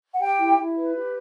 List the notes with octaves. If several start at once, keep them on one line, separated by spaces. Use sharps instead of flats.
F#5
G4 G5
E4
E4
B4
G4